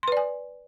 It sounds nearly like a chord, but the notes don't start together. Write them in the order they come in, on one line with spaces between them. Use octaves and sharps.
C6 B4 D5 G#5